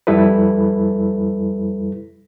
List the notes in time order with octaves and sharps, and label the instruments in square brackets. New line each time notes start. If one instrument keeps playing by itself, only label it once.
[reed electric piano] F2 G3 E4 A4 B4